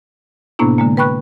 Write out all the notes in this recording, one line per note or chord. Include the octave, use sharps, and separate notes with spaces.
A2 C3 A#3 B3 D4 E4
D3 G#3 A#3
B4 G5 B5 C#6 F#6